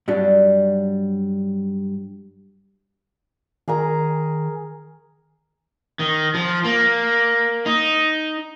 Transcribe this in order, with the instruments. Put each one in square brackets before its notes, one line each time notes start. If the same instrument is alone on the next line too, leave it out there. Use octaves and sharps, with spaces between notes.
[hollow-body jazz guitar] G2 F#3 G3 D4
[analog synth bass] D#3 [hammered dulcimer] G#4 A#4 A#5
[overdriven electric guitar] D#3
F3
A#3
D#4